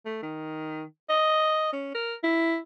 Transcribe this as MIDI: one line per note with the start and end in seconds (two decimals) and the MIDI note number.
0.05 0.20 57
0.23 0.83 51
1.10 1.69 75
1.73 1.90 61
1.95 2.15 70
2.23 2.57 64